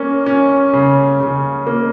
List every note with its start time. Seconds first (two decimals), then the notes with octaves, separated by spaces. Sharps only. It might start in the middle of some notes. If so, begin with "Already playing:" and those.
Already playing: A#3 C#4
0.26 C#4
0.73 C#3
1.20 C#3
1.67 A#3